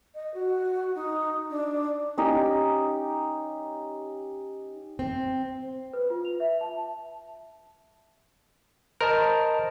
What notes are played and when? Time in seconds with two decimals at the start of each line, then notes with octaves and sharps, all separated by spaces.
0.15 D#5
0.34 F#4
0.95 D#4
1.50 D4
2.18 C#4 D#4 G4
4.99 C4
5.93 B4
6.10 F4
6.25 F7
6.40 E5
6.61 A5
9.01 A#4 C5 D#5 A5